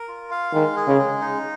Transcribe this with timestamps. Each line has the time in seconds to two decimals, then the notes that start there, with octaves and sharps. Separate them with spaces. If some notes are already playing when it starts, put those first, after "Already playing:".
Already playing: A#4
0.08 F4
0.31 F5
0.54 D#3 G#3
0.76 G#4
0.87 C#3
0.98 G#3
1.21 D#4